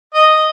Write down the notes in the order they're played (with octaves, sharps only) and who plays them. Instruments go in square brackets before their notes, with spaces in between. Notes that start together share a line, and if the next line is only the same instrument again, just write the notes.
[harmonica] D#5